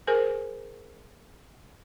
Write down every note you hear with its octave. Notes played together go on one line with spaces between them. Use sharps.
G#4 A#4 C5 G#5